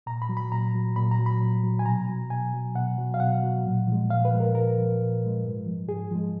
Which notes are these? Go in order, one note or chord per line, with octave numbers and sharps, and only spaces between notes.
A#2 A#5
B5
F#3
B5
A#2 A#5
F#3
A#2 B5
A#5
F#3
B5
A#2
F#3
G#5
B2 A#5
F#3
B2 G#5
F#3
B2 F#5
F#3
F5
B2 F#5
F#3
A#2
F3 G#3
A#2 F5
B4
F3 G#3
A#4
A#2 A#4
F3 G#3
A#2
F3 G#3
G#2
F3 G#3
G#2 G#4
F3 G#3